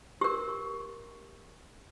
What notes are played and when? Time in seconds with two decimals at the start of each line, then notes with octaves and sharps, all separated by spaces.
0.21 G4 A#4